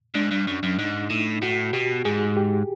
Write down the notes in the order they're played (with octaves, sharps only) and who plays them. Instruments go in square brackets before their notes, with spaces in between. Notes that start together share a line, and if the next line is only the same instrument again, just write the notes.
[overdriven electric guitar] G#2 [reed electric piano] D4
[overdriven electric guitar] G2
F#2
F#2
[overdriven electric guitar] G#2 [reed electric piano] D#4
[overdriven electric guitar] A2 [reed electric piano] E4
[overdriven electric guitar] A2 [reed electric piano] F#4
[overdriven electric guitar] B2 [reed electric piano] G4
[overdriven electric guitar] G#2 [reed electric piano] G#4
[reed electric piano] G4